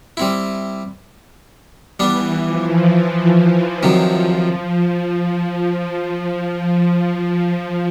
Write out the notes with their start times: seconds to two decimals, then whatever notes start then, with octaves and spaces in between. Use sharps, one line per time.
0.17 G3 C4 E4
2.00 E3 G3 B3 D4
2.46 F3
2.91 F3
3.37 E3
3.83 C3 D#3 F3 F#3